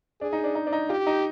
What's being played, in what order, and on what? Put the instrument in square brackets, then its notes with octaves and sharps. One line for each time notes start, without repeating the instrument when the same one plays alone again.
[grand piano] D4 [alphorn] G#4
[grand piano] D#4
D4
D#4
D4
D#4
[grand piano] F4 [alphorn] G4
[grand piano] D#4